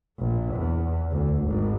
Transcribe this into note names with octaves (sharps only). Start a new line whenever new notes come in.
A#1
E2
D2
G#1